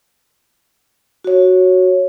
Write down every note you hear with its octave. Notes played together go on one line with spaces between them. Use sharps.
F#4 C#5